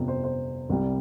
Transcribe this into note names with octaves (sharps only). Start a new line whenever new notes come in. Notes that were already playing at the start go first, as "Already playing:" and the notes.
Already playing: G1 F2 C3
C5
C5
C2 C3 G3